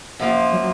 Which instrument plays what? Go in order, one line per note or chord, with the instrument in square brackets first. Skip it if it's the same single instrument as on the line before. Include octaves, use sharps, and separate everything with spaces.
[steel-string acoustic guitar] F#2 F3 A#3 F4
[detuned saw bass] F#3